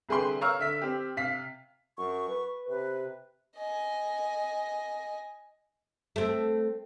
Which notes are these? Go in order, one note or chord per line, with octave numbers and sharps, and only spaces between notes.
C2 D3 G#4 B4 G5 C6
C#5 F5 A#5 C#6 E6 F6
D3 E5 B6
C4 G4
C3 F5 B6
F#2 C#6
B4
C3 B4
D#5 G#5
A3 C4